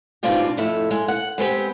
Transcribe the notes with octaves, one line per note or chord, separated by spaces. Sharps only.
G#2 B2 C4 D4 F4 G4
F2 A2 E5
G#3
F#5
G#3 B3 C4 G4